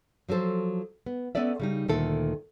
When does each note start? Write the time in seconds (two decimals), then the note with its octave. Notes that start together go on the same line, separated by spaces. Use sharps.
0.29 F3 F#3 F4 A4 C5
1.06 B3
1.35 B3 C#4 A4 D5 E5
1.59 C#3 G3 D#4
1.88 D2 A#2 D#3 A4 E5